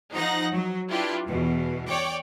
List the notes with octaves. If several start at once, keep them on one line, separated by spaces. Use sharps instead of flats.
F3 D#4 F#5 A#5 A#6
F#3
D4 E4 F4 G4 B4
E2 B2
C#5 D5 G5 D6